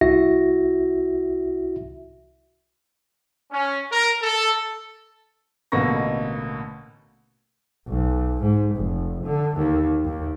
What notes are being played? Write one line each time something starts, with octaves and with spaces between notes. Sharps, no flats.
C2 E4 F#4 E5 A#6
C#4
A#4
A4
A1 B2 D3 A#3 C#6 A#6
B1
G#2
F1
D3
D#2
D#2